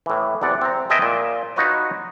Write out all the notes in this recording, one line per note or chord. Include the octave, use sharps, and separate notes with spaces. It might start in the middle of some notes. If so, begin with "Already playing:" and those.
A2 E3
E2 C3 D5 F#5
C4 A#5
G#4 B4 D#5 E5 G5 A5
A#2
D#4 F4 F#4 B4 C#5 D#5